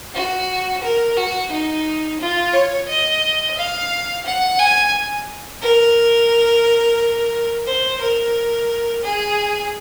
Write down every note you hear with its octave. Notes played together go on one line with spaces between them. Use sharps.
F#4
A#4
F#4
D#4
F4
C#5
D#5
F5
F#5
G#5
A#4
C5
A#4
G#4